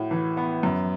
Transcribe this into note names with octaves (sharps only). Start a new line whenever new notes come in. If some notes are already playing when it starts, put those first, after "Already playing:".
Already playing: A2 F#4
E3
B3
F#2